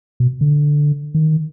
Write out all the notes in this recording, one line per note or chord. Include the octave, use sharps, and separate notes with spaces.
B2
D3
D#3